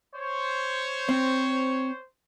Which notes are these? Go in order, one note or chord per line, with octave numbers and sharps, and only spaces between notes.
C5 C#5
C4